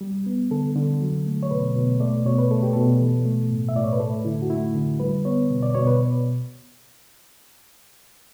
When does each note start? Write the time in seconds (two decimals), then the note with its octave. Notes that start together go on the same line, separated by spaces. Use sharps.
0.01 G3
0.26 B3
0.51 D3 A4
0.76 D3
1.01 F#3
1.27 A3
1.43 C#5
1.51 B2 B4
1.75 B2
2.00 A3 D5
2.25 B2 C#5
2.38 B4
2.51 A3 A4
2.63 G4
2.73 B2 A4
3.01 E3
3.26 A3
3.51 A2
3.69 E5
3.75 A2 D5
3.84 C#5
3.92 B4
4.00 A3 A4
4.25 D3 E4
4.42 F#4
4.50 A3 E4
4.75 D3
5.00 G3 B4
5.25 B3 C#5
5.51 B2
5.63 D5
5.75 B2 C#5
5.87 B4